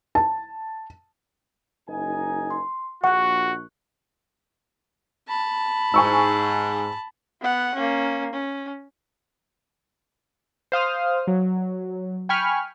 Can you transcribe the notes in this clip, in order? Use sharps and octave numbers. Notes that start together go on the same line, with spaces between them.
A5
F#1 D#4 G#5
C6
A#1 F#4 F#5 C#6 F#6
A5 B5
G#2 G#5 C#6 E6
B3 F#5
A#3 C#4
C#4
C5 F5 D#6 F6
F#3
G5 G#5 B5 C#6 F6